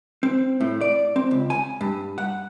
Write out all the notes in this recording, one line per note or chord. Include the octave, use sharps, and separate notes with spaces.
C4
A2
D5
C4
C#2
G#5
G2
F#5